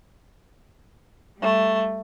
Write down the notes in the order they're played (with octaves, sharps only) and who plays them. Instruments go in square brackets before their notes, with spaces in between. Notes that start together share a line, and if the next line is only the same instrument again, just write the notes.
[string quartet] G3 A3